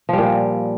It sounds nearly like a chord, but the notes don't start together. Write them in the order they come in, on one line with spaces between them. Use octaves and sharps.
F3 G3 A#2